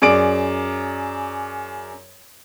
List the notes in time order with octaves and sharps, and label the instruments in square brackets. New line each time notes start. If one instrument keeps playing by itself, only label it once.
[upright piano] F#2 G#4 D5 D7